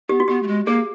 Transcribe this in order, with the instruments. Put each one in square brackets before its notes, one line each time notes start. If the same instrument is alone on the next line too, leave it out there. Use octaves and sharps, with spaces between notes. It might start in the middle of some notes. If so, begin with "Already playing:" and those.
[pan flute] B3 [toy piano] G4
[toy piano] F#4
[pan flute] B3 [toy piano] G4
[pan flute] A3
G#3
[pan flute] A#3 [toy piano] G#4